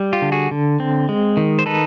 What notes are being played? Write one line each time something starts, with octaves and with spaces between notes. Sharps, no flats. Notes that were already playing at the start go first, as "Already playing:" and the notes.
Already playing: G3
F4 G4
D3
F#4 G#4
D3
C4
G#3
D#3
C5
D#4 A4 B4